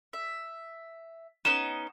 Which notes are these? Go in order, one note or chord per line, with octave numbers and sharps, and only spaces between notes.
E5
B3 C#4 D#4 E7